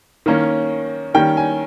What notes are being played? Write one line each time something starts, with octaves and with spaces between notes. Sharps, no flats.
D#3 A#3 C#4
D#3 G3 A#3 C#4 G5
G#5